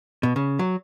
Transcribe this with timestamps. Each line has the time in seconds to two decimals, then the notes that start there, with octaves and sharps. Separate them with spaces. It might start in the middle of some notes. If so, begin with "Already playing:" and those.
0.23 B2
0.36 C#3
0.59 F#3